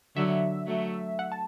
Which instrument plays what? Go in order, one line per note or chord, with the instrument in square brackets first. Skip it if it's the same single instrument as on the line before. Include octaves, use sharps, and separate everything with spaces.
[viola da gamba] D3 F#3 [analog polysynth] E5
[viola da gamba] F#3 A3
[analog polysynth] F#5
A5